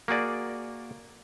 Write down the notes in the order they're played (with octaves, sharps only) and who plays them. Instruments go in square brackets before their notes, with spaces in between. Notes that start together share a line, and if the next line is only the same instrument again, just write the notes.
[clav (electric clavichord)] A#3 F#4 G#4 D5